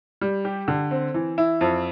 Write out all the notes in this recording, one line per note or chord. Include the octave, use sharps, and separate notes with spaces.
G3
G4
D3
C4
E3
E4
F2